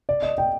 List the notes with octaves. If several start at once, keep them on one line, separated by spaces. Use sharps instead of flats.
D5
D#5
G5